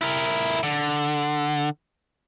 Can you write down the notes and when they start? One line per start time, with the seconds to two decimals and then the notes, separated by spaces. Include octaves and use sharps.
0.01 E4 A#4
0.63 D3